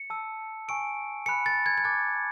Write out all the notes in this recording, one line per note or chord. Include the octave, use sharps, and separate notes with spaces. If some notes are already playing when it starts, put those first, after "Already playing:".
Already playing: C#7
A5 E6
G#5 C#6 E6 D7
G#5 B5 F#6 C#7
A6
G#6
G#6
A5 D6 F#6 A6